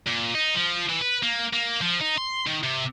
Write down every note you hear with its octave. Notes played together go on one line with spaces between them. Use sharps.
A#2
D#4
F3
E3
B4
A#3
A#3
F3
D#4
C6
D#3
C3